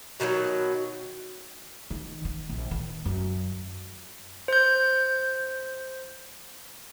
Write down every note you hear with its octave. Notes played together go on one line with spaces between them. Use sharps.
B2 D#3 E3 F#3
D#3
D#3
A#1
D#3
F#2
C5 G6